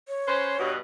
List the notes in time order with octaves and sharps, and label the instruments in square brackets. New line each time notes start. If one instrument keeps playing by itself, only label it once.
[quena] C#5
[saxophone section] C#4 B4 C5
G2 B2